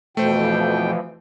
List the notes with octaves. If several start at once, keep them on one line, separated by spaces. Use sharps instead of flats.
F2 B2 E3 F3 A3 C5 G5